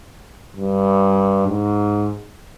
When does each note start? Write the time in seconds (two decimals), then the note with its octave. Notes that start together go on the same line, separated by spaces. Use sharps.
0.57 G2
1.48 G#2